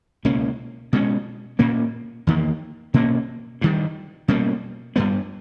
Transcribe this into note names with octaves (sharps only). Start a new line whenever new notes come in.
C#2 B2 A#3 C#4
B2 G#3 C#4
A#2 A#3 C#4
E2 D#3 A#3
B2 A#3 C#4
G2 D#3 G3
B2 G3 A#3 C#4
G2 G3 B3